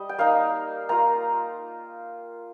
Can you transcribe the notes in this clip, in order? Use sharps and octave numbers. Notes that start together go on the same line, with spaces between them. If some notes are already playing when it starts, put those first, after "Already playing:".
Already playing: G3 D#5
G5
A#3 D#4 F5
A#3 F4 A#5